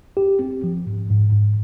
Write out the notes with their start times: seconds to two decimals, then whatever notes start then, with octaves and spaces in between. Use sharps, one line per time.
0.17 G4
0.39 C4
0.64 F3
0.86 G#2
1.10 G#2
1.33 G#2